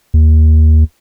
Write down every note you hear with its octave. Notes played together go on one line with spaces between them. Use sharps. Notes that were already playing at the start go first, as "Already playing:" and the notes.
D#2